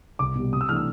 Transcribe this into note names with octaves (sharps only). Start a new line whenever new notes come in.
C2 D6
B2 G3
C3 D#6
E6
E3 A3 D4 F6
E6